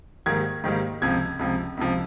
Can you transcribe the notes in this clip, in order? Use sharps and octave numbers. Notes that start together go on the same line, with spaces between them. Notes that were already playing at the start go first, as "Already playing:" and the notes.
G#2 D#3 G3 A#3 G#6
G#2 D#3 G3 A#3
C#2 C3 F3 G#6
C#2 C3 F3
C#2 C3 F3